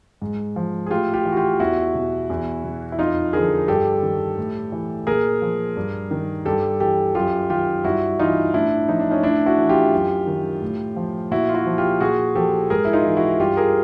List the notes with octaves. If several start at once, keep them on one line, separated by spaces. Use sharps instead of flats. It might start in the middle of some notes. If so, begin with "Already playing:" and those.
G#2
F3
G#4
A2 F4 G4
F4 G4
E3
F#4
F4 G4
E2 E4 F#4
B2
E2
B2
E4
F2 D#4 F4
D3 F3 G#4 A#4
G2 G4 A4
D#3
A2
E3
A#2 G#4 A#4
F3
G2
D#3
G2 G4 A4
E3 G4 A4
F#2 F4 G4
D#3 F4 G4
G2 E4 F#4
E3 D#4 F4
A2 D4 E4
F3 D#4
D4
C#4 D#4
A2 D4 E4
E4 F#4
E3
F4 G4
F#2
D#3
A2
F3
A#2 E4 F#4
F4
E4 F#4
F3
F4 G4
A#2 F#4 G#4
F3 G4 A4
G#2 G#4 A#4
E4
D#4 F4
E3
E4 F#4
G2 F4 G4
G#4 A#4